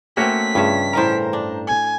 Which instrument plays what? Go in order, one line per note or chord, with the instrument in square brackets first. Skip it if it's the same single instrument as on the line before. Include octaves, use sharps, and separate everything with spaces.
[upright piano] A3 [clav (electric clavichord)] A#3 F#4 C#5 [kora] C4 C#4 [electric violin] B6
[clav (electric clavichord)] G2 C#4 E5 [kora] C#3 F3
[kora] A2 E3 A#4 [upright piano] C5 A#5
[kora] D4
[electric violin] G#5